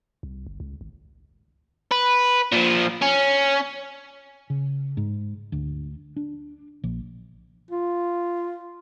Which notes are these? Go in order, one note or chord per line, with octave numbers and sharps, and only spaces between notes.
C2
G1
C#2
G#1
B4
A#2 F3
C#4
C#3
G#2
D2
D4
A#1
F4